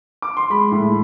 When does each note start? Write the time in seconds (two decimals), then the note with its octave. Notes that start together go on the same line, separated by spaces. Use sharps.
0.22 D6
0.37 C6
0.50 G#3 B5
0.72 A2